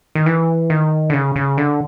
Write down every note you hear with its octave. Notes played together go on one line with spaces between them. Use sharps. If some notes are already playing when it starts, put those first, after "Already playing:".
D#3
E3
D#3
D3
C#3
C#3
D3